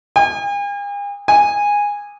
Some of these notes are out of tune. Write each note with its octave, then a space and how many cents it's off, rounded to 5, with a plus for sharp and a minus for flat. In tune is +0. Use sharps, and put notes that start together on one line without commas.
G#5 -45
G#5 -15